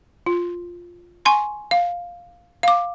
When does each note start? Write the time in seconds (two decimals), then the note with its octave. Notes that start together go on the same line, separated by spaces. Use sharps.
0.26 F4
1.25 G#5 C6 C#6
1.71 F5
2.63 F5 D6